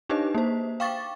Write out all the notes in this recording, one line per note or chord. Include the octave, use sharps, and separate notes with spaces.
D4 D#4 G4 B4 D#5
A#3 C5
F5 G5 C#6 D6 A6